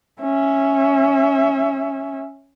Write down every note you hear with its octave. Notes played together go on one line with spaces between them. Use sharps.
C#4 E5